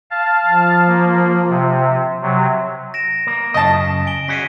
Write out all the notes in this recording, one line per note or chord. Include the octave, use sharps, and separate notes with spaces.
F5 A5
F3
A#3
C3
C3 F#3
A#6 D7 E7
A#3
F#2 C#3 D#5 A5
G#5 D7 G7
C#4 F#4 G#4 B6 C#7 D#7